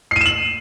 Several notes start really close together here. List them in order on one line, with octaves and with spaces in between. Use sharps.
C7 D#7 E7 F#7